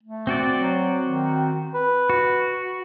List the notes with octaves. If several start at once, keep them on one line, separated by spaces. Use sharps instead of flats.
A3
C4 F#4 D5
F#3
D#3
B4
F#4